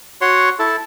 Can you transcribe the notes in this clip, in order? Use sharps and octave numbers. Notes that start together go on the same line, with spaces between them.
F#4 C#5 C6
E4 A4